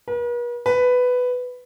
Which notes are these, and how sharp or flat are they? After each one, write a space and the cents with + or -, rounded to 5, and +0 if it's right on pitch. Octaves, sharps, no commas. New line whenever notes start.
B4 -45
B4 +10